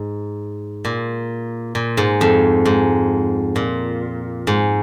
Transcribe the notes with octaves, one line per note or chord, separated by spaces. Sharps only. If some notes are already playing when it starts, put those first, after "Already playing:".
Already playing: G#2
A#2
A#2
G#2
F2
G#2
A#2
G#2